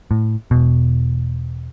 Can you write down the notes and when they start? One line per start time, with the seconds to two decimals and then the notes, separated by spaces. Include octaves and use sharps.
0.11 A2
0.51 E1 B2